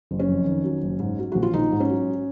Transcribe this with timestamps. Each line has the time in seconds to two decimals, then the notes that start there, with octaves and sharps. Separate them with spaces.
0.11 F#1
0.19 C#4
0.29 F2
0.46 D#3
0.64 F#3
0.83 F#1
0.99 G#2
1.19 F#3
1.32 A#1 F#4
1.43 F4
1.53 A#1 D#4
1.72 G#2
1.80 C#4
1.89 F#3